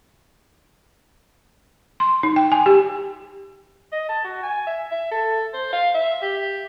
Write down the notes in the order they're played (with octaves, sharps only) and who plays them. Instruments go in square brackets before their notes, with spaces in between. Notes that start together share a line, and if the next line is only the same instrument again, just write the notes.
[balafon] C6
D#4
G5
G#5
G4
[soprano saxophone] D#5
A5
F#4
G#5
E5
E5
A4
C5
F5
E5
G4